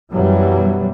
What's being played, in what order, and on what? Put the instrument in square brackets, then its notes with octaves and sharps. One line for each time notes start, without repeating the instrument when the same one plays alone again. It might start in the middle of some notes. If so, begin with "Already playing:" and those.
[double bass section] F#2 B2 E3 F#3 G3